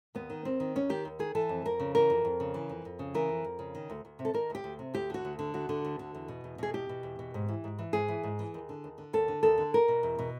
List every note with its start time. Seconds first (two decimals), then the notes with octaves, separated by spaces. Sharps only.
0.15 D#2 B3
0.30 D#3
0.45 D#2 C4
0.60 D#3
0.75 D#2 C#4
0.90 D#3 G4
1.05 D#2
1.19 D#3 G#4
1.35 E3 A4
1.49 F2
1.65 F2 A#4
1.80 C#3
1.95 E3 A#4
2.10 F2
2.25 F2
2.40 C#3
2.54 E3
2.69 F2
2.85 F2
2.99 C#3
3.14 E3 A#4
3.29 F2
3.44 F2
3.59 C#3
3.75 D#3
3.90 D2
4.05 D2
4.19 C3
4.25 A4
4.34 D#3 A#4
4.50 D2 G4
4.64 D2
4.79 C3
4.94 D2 G4
5.10 D3 F#4
5.25 D2
5.39 D3
5.54 D2 F#4
5.69 D3
5.85 D2
5.99 D3
6.15 E2
6.28 B2
6.44 E2
6.58 B2 G#4
6.74 E2 G4
6.89 B2
7.03 E2
7.19 B2
7.34 G#2
7.48 E3
7.64 G#2
7.79 E3
7.93 G#2 G#4
8.08 E3
8.23 G#2
8.39 E3
8.54 D#2
8.69 D3
8.84 D#2
8.98 D3
9.13 D#2 A4
9.28 D3
9.43 D#2 A4
9.58 D3
9.74 E2 A#4
9.88 B2
10.03 E2
10.19 B2